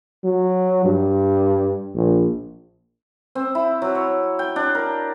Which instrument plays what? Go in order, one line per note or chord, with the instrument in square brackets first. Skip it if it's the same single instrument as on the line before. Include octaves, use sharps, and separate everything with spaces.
[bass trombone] F#3
G2
A#1
[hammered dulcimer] C4
E4
F#3
C#5
G5
D4
A#4